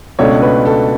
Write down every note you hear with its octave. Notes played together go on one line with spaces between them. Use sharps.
C#2 B2 A3 D4 C#5
B4
A4